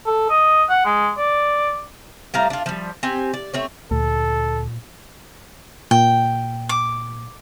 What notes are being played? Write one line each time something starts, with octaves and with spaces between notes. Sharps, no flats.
A4
D#5
F#5
G#3
D5
A2 G3 F5 A#5
D4 F4
F3 G3
C4 G4 G#5
D5
A3 C4 C#5
D2 A#2 A4
A#2 G5
D6